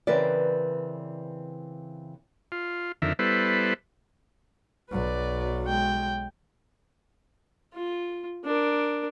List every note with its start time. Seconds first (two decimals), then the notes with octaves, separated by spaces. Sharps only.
0.07 C#3 E3 C4 A#4 B4 D5
2.52 F4
3.02 F2 D3 D#3 A#4 E5
3.19 G3 B3 E4 A4 B4 C5
4.91 B1 F#3 B4 D5
5.64 G#3 G5
7.74 F4
8.45 D4 A#4